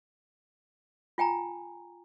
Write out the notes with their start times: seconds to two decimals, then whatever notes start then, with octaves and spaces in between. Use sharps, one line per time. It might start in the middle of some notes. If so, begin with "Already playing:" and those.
1.18 F4 G5 G#5 A#5